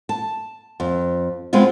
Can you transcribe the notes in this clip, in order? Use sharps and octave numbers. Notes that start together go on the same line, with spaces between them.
A5
F2
G#3 B3 C4 F4